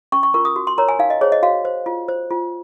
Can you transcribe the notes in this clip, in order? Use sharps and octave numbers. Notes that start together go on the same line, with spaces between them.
C#4 C#6
C#6
F4 A#4 C#6
D#6
F#4
C6
A#4 C#5 A#5
G#5
D#4 F5
D#5
G#4 C5 C#5
D#5
F#4 F5
C5
F4
C5
F4